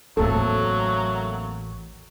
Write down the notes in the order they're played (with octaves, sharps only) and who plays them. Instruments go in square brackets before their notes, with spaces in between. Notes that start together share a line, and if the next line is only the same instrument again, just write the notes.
[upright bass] A1 E2 [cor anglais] F#3 [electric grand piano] A3 A#3 C4 [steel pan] A4